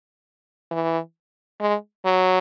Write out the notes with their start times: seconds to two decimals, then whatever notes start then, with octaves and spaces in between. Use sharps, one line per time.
0.71 E3
1.61 G#3
2.05 F#3